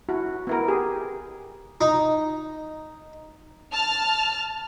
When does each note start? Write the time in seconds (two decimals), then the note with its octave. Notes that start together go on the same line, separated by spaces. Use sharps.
0.09 E4 F#4
0.47 B3 E4 A#4
0.68 G4 G#4
1.81 D#4
3.71 A5 F6